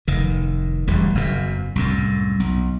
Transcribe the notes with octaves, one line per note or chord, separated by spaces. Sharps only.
F1 D#3
D1 A1 G3
F#1 F#2 B2
C2 F#2 A2
B1